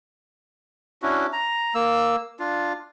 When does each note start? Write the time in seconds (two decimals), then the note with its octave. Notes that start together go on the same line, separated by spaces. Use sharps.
1.02 C#4 D4 E4 F#4
1.33 A#5
1.75 A#3 E6
2.39 D4 F4